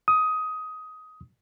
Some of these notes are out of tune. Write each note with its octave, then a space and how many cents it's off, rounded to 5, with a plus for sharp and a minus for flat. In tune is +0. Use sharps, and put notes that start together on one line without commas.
D#6 +15